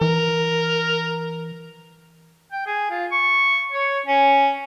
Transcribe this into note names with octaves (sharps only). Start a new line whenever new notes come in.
E3 A#4
G5
G#4
F4
C#6
C#5
C#4